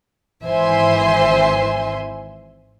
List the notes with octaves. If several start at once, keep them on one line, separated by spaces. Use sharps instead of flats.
G#1 E3 C5 E5 G#5 C6